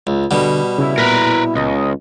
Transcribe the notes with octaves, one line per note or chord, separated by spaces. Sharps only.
C#2
B2 D3 G3 F#5
C#3 E4
A#2 B3 A#4 B4
C#2 D#5